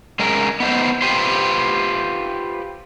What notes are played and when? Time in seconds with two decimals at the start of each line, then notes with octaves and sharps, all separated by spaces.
0.19 G#3 C#4 A#4
0.60 B3 D#4 C5
1.02 F4 G4 B4 C5